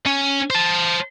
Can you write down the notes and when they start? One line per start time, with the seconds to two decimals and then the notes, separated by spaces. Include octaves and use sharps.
0.06 C#4
0.50 C5 A5